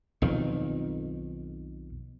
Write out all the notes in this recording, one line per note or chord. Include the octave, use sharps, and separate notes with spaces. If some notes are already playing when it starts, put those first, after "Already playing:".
B1 F2 D#3